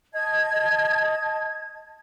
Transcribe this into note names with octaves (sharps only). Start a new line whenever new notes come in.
D#5 A5 G#6